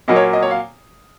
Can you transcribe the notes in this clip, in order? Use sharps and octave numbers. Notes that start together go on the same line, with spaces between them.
A#2 F#3 A#3 D#5
C#5
D#5
C#5
F5